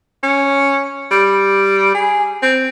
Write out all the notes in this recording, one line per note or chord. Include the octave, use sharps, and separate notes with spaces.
C#4
G3
G#4
C4